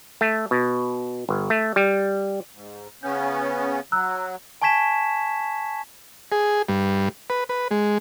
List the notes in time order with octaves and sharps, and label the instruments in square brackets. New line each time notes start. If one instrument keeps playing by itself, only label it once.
[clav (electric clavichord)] A3
B2
G1
A3
G3
[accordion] G#2
[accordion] C#3 B3 C#4 [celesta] G6
[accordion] F#3 [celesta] A#5 E6 F#6
[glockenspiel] G#5 A5 C#6 G#6 B6 E7
[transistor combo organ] G#4
G2
B4
B4
G#3